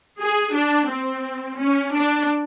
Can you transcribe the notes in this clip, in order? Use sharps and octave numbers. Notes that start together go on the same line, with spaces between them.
G#4
D4
C4
C#4
D4